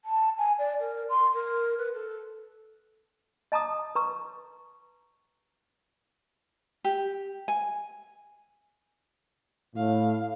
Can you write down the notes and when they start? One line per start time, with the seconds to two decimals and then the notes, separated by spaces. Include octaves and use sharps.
0.05 A5
0.38 G#5
0.59 D5
0.80 A#4
1.09 C6
1.34 A#4
1.78 B4
1.94 A4
3.52 D#5 A5 A#5 D6 D#6
3.95 B4 A#5 C#6
6.84 G4
7.48 G#5
9.76 A2 F5